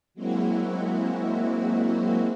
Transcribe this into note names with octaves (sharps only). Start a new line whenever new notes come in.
F#3 G#3 A#3 C4 E4 F#4